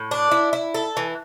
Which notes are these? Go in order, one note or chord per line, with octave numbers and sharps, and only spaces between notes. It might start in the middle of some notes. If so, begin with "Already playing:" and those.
Already playing: A2
D4
E4
E4
A4
E3